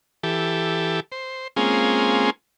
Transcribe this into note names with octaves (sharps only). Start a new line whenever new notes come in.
E3 G4 A4
C5
G#3 A#3 C4 C#4 F4 G#4